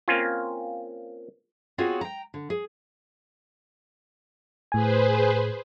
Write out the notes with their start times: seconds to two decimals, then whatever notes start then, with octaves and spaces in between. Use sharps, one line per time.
0.08 A#3 C4 C#4 F4
1.78 B3 C4 F4 F#4 G#4 C#5
2.01 G5 A#5
2.34 D3
2.50 G#4
4.72 A2 G#4 B4 C5 G#5